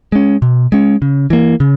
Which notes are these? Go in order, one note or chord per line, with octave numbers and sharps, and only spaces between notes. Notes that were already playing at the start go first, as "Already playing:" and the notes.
G#3 C#4
B2
G#3 C#4
C#3
E3 A#3
C#3